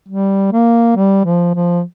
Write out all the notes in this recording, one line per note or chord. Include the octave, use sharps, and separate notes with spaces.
G3
A#3
G3
F3
F3